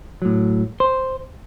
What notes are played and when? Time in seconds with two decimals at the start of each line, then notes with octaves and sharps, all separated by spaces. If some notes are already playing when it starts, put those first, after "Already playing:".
0.22 A2 F#3
0.80 C5